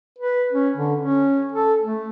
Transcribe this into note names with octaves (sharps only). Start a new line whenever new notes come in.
B4
C#4
D3
C#4
A4
A3